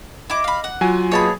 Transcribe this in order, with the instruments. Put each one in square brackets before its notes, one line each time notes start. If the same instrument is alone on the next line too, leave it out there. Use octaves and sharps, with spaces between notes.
[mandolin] E4 D6 [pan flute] D#5
[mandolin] F5 B5
F#5
[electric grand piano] F#3 G#5 [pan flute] F4
[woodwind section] B2 A#3 G#4 [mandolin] C#5 A5 B5